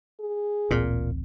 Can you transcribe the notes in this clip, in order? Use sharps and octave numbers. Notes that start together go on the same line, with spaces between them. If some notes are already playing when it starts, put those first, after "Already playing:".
G#4
D1 A1 A#2 C4